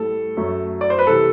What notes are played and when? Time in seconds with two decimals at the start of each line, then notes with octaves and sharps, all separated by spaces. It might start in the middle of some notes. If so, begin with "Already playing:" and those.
Already playing: A2 G3 A4
0.37 F#2 F#3 A3
0.81 D5
0.90 C5
0.99 B4
1.07 C3 E3 G3 A4